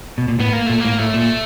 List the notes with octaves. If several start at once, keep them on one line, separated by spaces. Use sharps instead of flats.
B2
A#2
A2 B3
A#3
A#2 A3
A2 A#3
A2 A3
A#2